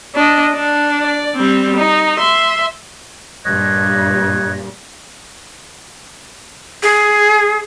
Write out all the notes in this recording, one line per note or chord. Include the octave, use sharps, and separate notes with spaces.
D4 D#5
D4
D5
G3 C4
D#4
E5 C6
G2 A#2 B4 C#5 D#5
G#4